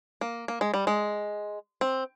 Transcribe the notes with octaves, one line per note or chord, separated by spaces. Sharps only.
A#3
A#3
G#3
G3
G#3
C4